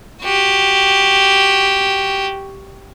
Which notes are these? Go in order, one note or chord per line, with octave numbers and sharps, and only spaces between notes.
F#4 G4